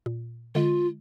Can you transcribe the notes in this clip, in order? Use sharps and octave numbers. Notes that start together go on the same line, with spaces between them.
A#2
D3 G#3 F4